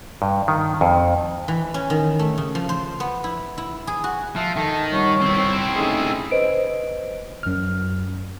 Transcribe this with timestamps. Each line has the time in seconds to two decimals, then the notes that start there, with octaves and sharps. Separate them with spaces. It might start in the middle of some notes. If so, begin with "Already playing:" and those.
0.22 G2
0.48 D#3
0.81 F2
1.48 E3
1.74 C#4
1.90 D#3
2.19 A3
2.38 C#3
2.55 F3
2.69 C5
3.00 B3
3.24 E4
3.58 E4
3.87 G#4
4.04 F#4
4.36 F3 E5
4.56 D#3 A4
4.92 G1 G2 C#5 F#5
5.21 C4 E4
5.75 A3 C#4 D#4 G#4
6.31 B4 C5 D#5 D7
7.43 F#2 F6